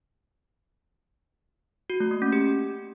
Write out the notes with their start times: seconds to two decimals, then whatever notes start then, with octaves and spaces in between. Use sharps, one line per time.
1.90 F#4
2.00 A3
2.11 A#3
2.22 C#4
2.32 G4